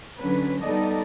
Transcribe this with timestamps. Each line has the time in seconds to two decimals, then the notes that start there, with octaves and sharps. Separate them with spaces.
0.18 D3 F#3 C#4 B4
0.62 G3 B3 D#4 A4 D5 D#5